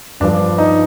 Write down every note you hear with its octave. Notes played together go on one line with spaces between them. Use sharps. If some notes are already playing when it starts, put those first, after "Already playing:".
G1 G2 F3 D4
D#4